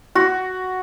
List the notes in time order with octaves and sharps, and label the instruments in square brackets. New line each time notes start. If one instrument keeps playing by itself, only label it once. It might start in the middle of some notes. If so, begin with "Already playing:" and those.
[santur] F#4